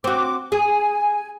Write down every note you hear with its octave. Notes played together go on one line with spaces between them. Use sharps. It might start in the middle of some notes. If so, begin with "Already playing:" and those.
C4 F#4 D6
G#4 G#5